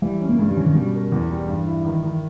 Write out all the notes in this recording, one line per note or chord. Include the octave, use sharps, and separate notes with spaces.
E3 G3
C#4
A#3
G2 G#3
G3
E3 C#4
D#3
B2 G3
A#4
E2 E3
G3
G2
E4
D#3
D#3